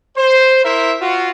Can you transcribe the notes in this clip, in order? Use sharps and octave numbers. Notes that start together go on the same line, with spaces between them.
C5
E4 A#4 C5 E5
F4 F#4